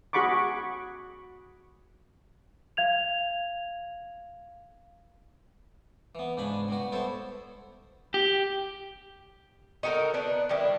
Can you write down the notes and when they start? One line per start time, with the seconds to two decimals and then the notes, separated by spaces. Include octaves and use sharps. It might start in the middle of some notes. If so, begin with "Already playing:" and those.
0.13 F#4 G#4 F#5 B5 C#6 D6
2.77 F5 G#6 F7
6.15 E3 B3
6.37 G#2 C#3 D4 G#5 B5
6.68 B2 G3 F#4
6.92 B3 E4 A4 C5 C#5
8.14 G4
9.83 D#4 F#4 A4 A#4
10.14 B3 D4
10.49 D#3 G3 D4 E4